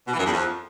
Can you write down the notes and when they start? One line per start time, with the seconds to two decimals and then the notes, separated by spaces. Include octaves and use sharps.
0.07 B2
0.13 E3
0.19 F#2
0.25 E2
0.31 F2